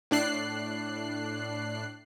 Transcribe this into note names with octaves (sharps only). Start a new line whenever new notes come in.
A2 D4 F#6 C7